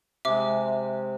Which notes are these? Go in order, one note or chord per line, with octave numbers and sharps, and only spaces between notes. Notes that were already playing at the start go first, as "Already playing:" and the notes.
C3 G#3 E5 D6